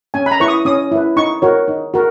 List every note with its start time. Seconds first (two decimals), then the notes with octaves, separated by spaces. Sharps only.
0.14 C#4 G#5
0.26 B5
0.31 A#5
0.40 E4 B4 C#6
0.48 D#6
0.65 C#4 D#6
0.92 E4 B4
1.17 D#4 C#6
1.42 F#4 A#4 C#5
1.68 D#4
1.94 F#4 A#4